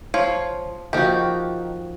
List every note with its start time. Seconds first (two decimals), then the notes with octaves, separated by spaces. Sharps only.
0.14 F3 C#5 F5
0.93 D#3 F3 D#4 F#4 G4